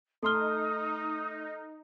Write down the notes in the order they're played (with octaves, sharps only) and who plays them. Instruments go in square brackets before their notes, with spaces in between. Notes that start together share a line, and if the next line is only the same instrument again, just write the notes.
[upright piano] A3 C6 G7 [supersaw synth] D#4 [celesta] A4 F6 [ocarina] D#6